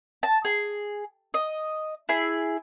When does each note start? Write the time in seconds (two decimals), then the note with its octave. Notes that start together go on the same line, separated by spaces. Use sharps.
0.23 A5
0.45 G#4
1.34 D#5
2.09 E4 G#4 G#5